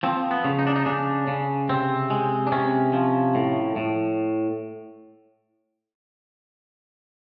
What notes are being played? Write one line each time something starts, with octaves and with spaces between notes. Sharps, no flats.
F3 C4
B3
C#3
D#4
D4
D#4
C#3 D4
C#3
C3 C4
G#3
D4
C3 C#4
F3
A2
A2